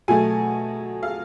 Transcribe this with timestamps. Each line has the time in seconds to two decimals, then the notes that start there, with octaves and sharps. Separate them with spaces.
0.08 B2 F#3 A3 G#5
1.03 F5